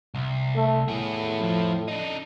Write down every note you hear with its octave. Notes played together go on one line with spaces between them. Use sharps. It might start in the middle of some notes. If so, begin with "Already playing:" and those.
C2
A3
A2 B3 G#4
F2 F3
D4 D#4